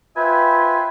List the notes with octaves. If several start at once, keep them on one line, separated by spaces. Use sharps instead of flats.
F4 B4 C5 E5 G5 G#5